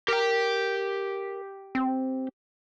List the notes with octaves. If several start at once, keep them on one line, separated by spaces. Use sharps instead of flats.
G4 A#4 G5
C4